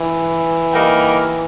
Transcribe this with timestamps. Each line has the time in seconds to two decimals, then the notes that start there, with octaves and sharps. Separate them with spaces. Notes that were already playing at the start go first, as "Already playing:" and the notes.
Already playing: E3
0.73 G3 A#3 D#4 G4 A#4